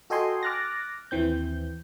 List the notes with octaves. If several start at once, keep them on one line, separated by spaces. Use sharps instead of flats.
F#4 A4 D#5 G5 G#5 C6
D6 F6 F#6 A6 A#6
D#2 E3 C4 G6